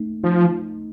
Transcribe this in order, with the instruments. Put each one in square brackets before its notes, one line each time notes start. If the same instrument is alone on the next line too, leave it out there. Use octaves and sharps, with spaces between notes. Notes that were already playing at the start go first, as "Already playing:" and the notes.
Already playing: [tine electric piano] A3 D#4
[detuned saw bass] F3 [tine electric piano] D#4